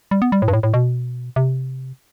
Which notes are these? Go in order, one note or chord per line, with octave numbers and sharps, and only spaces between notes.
G3
B3
G3
A2
G2
A2
A2
B2
C3